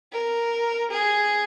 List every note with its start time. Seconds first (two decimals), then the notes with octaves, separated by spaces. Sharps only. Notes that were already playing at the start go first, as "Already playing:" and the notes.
0.13 A#4
0.91 G#4